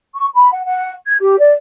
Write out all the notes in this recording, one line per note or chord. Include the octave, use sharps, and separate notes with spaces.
C#6
B5
F#5
F#5
G#6
G4
D5